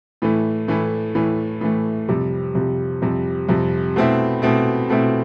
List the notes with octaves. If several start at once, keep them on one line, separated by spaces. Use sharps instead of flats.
A2 E3 A3
A2 E3 A3
A2 E3 A3
A2 E3 A3
F2 C3 G3
F2 C3 G3
F2 C3 G3
F2 C3 G3
B2 A3 C4 E4
B2 A3 C4 E4
B2 A3 C4 E4